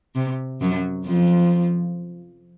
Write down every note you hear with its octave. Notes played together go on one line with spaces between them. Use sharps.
C3
F#2 F#3
F2 F3